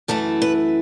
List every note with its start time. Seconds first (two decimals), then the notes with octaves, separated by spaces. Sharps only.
0.08 F#2 E3 A3 E4 A4
0.42 B4